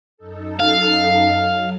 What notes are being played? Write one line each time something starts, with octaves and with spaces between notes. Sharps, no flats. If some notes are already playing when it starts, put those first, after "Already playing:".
F#2 D#4 A4
F5
F#3